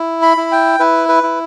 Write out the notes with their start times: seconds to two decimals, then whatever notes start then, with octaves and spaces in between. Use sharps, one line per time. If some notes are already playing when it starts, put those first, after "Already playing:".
Already playing: E4
0.22 B5
0.37 E4
0.52 G5
0.80 E4 B4
1.09 B4
1.23 E4